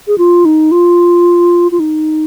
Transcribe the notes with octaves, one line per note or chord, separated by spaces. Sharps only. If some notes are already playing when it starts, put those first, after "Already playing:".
G#4
F4
D#4
F4
F4
D#4